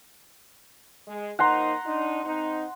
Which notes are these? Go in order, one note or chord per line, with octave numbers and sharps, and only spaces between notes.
G#3
F3 A#3 D#4 F#5 A#5 C6
D4 D#4
G#2 C4 D#4